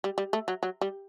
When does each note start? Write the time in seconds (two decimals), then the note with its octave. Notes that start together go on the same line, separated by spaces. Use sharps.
0.04 G3
0.18 G3
0.33 A3
0.48 F#3
0.63 F#3
0.81 G3